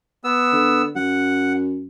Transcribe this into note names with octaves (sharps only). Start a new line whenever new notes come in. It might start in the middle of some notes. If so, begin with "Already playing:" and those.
B3 E6
D3
F#2 F#5